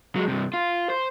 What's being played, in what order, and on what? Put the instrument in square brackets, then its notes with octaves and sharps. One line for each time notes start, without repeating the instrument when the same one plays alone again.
[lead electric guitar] F#3 G#3
G2 C3
F4
C5